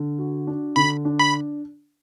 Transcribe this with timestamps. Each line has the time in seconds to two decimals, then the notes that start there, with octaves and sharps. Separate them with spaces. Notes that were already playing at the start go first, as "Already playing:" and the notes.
Already playing: D3
0.19 F#4
0.47 D4
0.76 D3 B5
1.05 D4
1.19 B5